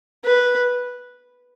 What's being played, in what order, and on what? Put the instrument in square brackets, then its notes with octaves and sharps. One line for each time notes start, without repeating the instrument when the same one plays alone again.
[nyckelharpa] B4